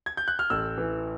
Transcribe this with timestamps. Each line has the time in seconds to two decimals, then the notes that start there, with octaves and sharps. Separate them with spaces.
0.06 G#6
0.17 G6
0.28 F#6
0.39 F6
0.50 A1 E6
0.78 E3